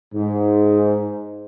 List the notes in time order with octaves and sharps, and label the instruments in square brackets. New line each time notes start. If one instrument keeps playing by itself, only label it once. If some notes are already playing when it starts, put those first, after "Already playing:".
[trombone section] G#2